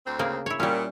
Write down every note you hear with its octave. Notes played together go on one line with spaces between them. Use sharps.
D2 C4
C#3 A#3 G#4
E4 C#5
A#2 G3 C#4